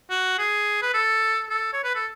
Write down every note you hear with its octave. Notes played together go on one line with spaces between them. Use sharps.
F#4
G#4
B4
A4
A4
C#5
B4
A4